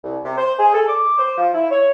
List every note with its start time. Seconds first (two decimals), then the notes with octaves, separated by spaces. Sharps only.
0.03 C2
0.24 C3
0.37 C5
0.59 G#4
0.73 A4
0.88 D6
1.18 C5
1.38 F3
1.54 E4
1.71 C#5